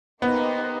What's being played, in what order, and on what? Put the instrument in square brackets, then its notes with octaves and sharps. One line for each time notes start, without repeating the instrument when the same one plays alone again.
[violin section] A#3 D#4 G4 C5 D#5 [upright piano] B3